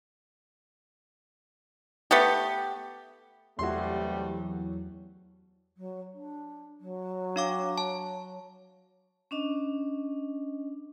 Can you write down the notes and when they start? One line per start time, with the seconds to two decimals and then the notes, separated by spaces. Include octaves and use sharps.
2.11 A3 B3 G4
3.59 E2 C3 F#3 G3 A3 F#4 C6
5.77 F#3
6.14 D4
6.80 F#3
7.36 D4 F5 D6
7.78 A5
9.31 C#4 D4 D#5